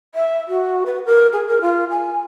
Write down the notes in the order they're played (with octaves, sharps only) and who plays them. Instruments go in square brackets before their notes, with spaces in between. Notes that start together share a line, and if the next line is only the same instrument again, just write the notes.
[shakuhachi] E5
F#4
B4
A#4
G#4
A#4
F4
G#5